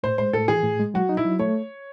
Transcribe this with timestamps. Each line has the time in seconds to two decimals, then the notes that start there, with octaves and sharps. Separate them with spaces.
0.03 A2 C5
0.18 G#3 C5
0.33 A2 A4
0.48 E3 G#4
0.64 A2
0.79 G#3
0.94 F#3 F#4
1.09 D#4
1.17 E4
1.25 F#3
1.39 A3 C#5